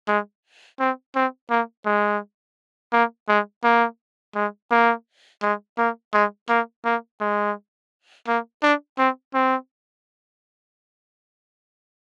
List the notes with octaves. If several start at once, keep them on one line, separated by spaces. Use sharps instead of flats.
G#3
C4
C4
A#3
G#3
A#3
G#3
A#3
G#3
A#3
G#3
A#3
G#3
A#3
A#3
G#3
A#3
D4
C4
C4